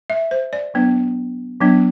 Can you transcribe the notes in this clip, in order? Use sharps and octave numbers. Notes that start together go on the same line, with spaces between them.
E5
C5
D5
F#3 B3 D4
F#3 B3 D4